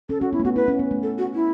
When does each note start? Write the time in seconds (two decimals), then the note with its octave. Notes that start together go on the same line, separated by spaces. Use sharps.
0.09 C#4 A4
0.21 C#4 F#4
0.33 B3 E4
0.40 A3
0.44 B3 F#4
0.56 E4 B4
0.68 C#4
0.79 B3
0.91 A3
1.03 A4
1.18 F#4
1.34 E4